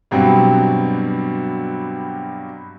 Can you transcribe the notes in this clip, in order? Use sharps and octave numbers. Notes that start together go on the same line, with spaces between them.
G2 B2 F#3 G3 C4